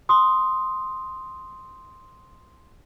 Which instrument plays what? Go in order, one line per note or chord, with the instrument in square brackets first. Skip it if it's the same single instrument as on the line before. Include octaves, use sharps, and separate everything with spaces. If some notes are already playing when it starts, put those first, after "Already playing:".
[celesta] C6 D#6